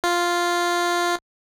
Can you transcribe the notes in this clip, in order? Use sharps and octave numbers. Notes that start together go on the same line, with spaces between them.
F4